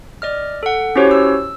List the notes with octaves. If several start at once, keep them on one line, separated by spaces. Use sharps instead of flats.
D5 D#5 F6
A4 F#5
C#4 E4 F#4 G4 C5 C#5
E6